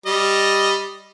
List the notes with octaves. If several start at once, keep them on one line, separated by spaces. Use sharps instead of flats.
G3 D#5